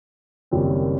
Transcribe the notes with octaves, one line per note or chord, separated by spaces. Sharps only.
F#1 F#2 D#3 G3 C4